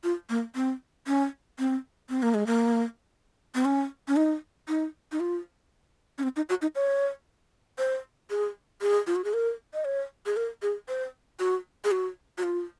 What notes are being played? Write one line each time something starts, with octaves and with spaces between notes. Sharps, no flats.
F4
A#3
C4
C#4
C4
C4
A#3
G#3
A#3
C4
C#4
C#4
D#4
D#4
D#4
F4
C#4
C4
D#4
F#4
D#4
C#5
C5
G#4
G#4
F4
F#4
G#4
A#4
D#5
C#5
G#4
A#4
G#4
C5
F#4
G#4
F#4
F#4
F4